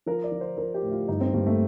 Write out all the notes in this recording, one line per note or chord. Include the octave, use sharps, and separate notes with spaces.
F3 A#4
D5
F3
C5
F3 A#4
G4
A2
F4
G2 D#4
C4
G2 A#3
A3